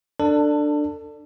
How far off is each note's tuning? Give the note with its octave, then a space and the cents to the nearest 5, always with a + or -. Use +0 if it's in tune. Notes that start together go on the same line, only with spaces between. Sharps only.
D4 +10 A4 +25